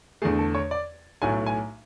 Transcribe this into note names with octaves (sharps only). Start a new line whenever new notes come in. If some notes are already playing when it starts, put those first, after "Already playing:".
E2 D3 A3 G#4
A4
C#5
D5
B1 A2 F#3 A3 G#5
G#5